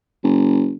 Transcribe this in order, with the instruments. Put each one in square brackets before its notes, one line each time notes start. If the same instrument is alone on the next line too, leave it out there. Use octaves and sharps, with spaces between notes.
[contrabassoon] F#1